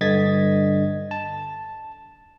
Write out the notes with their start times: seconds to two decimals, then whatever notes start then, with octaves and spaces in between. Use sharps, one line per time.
0.01 G2 D3 D#5 G#6 A6 B6
1.11 A5